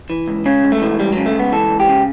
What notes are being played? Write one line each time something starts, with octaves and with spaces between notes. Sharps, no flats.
E3
C#2
C#3 C#4
C#2
A3
E3
C#2 G3
C#3 F#3
A3
C#2 B3
E3 A4
C#2
G4
C#3